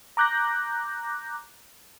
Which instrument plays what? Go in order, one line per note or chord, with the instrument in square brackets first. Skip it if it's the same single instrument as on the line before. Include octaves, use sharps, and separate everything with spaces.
[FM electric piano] A#5 D6 F#6 G6 A#6